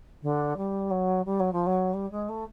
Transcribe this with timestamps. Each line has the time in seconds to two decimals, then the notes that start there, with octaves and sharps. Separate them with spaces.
0.22 D3
0.56 G3
0.90 F#3
1.25 G3
1.39 F#3
1.52 F3
1.66 F#3
1.93 G3
2.11 G#3
2.28 A3